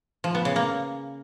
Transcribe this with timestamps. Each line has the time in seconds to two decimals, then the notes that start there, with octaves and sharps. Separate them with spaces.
0.24 F3
0.35 B3
0.45 C#3
0.56 A#3